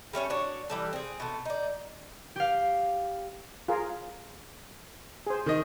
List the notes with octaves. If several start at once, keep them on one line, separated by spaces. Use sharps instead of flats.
G3 A3 C#4 C#5
D4 F#4 C#5
E3 G3 A4
C4 G#4
B2 A3
D#4 D5
G4 F5
F4 G#4 A#4
G#4 C5
D#3 D#5